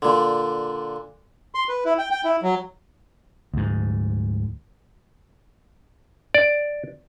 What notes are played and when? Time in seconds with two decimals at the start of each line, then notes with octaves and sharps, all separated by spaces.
0.02 A#2 D3
1.55 C6
1.69 B4
1.85 E4
1.98 G5
2.11 G5
2.24 E4
2.43 F#3
3.54 D2 G#2
6.34 D5